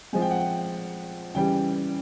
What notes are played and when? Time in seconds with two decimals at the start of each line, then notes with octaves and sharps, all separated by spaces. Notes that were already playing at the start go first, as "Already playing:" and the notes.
0.13 F3 G#3 C4 G#5
0.22 G5
0.31 F#5
0.40 G5
1.35 C#3 E3 G3 G5